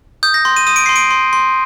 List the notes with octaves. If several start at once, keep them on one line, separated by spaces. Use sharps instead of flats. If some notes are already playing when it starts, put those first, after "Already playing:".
D#6 G6
A#6
C6
D#7
D#6 D#7
D7
C6 C7
D7
C6
C6